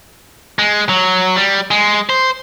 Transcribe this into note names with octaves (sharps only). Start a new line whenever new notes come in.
G#3
F#3
G3
G#3
C5